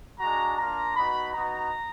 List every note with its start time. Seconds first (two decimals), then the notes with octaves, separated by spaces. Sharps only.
0.20 G#3 D4 F#4 A#5
0.58 A#3 D4 F4 A#5
0.96 B3 D#4 F#4 B5
1.34 B3 D#4 F#4 A#5